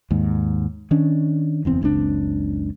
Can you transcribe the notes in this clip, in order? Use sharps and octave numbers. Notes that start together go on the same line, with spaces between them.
D#2 G#2
D#3 C#4 D4
F#1 E2 C4
F#1 C#2 C4 D4